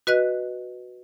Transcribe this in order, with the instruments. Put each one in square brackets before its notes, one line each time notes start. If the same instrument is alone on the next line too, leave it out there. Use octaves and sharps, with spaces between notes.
[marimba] F#4 B4 D#5 F#6